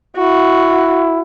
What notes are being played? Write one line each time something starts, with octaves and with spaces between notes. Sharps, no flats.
E4 F#4